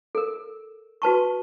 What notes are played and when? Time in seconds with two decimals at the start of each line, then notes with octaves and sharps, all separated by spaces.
0.15 A4 A#4
1.02 F#4 B4 A5 C#6